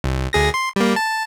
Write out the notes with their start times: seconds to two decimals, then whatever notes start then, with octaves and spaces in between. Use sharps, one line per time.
0.04 C2
0.33 D2 G#4 A#6
0.54 C6
0.76 G3 A#3
0.96 A5